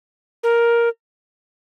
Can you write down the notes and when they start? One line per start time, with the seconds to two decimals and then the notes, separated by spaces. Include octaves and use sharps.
0.43 A#4